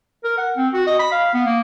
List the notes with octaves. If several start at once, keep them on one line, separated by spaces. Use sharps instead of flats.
A#4
F#5
C4
F#4
D#5
B5
F5
B3
A#3